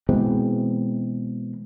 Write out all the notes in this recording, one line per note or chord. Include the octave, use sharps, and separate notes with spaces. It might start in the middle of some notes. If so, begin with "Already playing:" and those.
B2 E3 G#3 C4